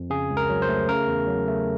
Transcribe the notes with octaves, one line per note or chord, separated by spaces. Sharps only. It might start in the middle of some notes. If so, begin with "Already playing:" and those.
Already playing: F2
C#3 G#4
C#2
A#4
F#3
C5
A3
C#3 A#4
E2
F#3
A3